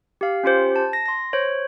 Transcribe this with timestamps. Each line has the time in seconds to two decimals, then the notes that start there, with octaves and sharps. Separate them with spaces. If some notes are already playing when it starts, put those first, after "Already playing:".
0.21 G4 F5
0.43 C#4 F4 G4 C5
0.76 A5
0.93 A#6
1.06 C6 A#6
1.33 C5 C#5